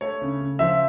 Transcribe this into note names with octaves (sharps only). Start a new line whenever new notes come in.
A3 C#5
C#3
C#3
F3 E5